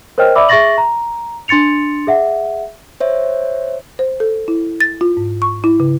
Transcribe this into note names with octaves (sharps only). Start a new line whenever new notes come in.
A#4 C5 C#5 D#5 G5 F6
D5 E5 B5 D6 E6
G#4 E5 C#6 A6 A#6 F#7
A#5
D4 C6 A6 C#7 F7
G#4 E5 F#5
C5 C#5 E5
C5
A4
E4
A6
F4
G#2
C#6
E4
C#3